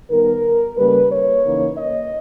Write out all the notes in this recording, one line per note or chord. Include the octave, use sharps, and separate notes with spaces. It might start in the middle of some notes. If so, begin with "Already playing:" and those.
D#3 G3 B3 A#4
C#3 G3 A#3 B4
C#5
C#3 E3 A#3 D#4
D#5